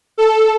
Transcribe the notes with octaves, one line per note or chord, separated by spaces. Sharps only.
A4